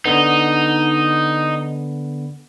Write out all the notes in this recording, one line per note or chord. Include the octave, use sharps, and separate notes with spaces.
D3 B3 D#4